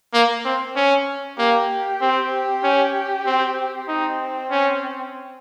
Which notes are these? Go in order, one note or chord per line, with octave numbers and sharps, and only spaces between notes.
A#3
C4
C#4
A#3 G4
C4
C#4
C4
C4 D#4
C#4